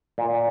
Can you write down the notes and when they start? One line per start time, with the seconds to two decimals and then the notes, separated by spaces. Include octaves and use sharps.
0.18 A#2